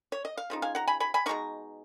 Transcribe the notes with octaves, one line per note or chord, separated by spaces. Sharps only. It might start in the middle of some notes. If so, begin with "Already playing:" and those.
C#5
D#5
F5
C#3 F3 D#4
F5 G#5
F#5 A#5
G#5 B5
G#5 B5
G#5 B5
B2 G#3 D#4 A#5 C#6